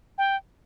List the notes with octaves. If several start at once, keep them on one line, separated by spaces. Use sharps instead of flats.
G5